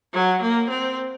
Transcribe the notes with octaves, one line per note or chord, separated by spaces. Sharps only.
F#3
A#3
C4